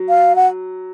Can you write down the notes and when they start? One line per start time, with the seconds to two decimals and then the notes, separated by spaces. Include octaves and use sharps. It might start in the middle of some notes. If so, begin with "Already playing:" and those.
Already playing: F#3
0.09 F5
0.36 F#5